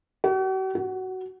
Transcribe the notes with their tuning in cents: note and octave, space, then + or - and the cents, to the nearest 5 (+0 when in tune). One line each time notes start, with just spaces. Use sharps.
F#4 +45
F#4 +15